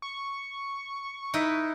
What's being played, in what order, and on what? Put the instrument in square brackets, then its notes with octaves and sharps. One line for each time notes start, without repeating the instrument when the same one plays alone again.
[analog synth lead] C#6
[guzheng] D#4 E4 B4